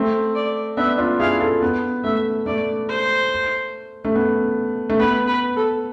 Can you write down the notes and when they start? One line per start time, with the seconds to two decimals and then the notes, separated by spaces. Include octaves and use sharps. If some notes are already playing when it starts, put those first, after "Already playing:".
Already playing: A3 C4
0.35 D5
0.77 B3 D4 E5
0.98 D4 F4
1.20 E4 G#4 F5
1.40 F4 A4
1.62 B3
2.04 A3 E5
2.46 A3 D5
2.89 C5
4.05 A3
4.15 B3
4.90 A3
4.99 B3 B4
5.27 B4
5.56 A4